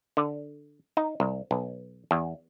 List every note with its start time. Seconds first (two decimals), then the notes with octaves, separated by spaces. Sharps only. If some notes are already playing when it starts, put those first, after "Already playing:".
0.17 D3
0.97 D#4
1.20 C2
1.51 B1
2.11 E2